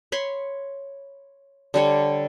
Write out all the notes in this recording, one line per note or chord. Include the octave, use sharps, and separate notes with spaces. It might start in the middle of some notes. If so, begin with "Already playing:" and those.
C#5 B5 C6
D3 G3 C#5